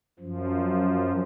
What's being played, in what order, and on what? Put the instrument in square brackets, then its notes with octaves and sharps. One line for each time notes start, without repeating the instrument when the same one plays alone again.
[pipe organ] F#2 F3